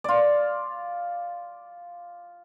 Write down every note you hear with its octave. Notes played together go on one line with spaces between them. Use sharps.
F4 D5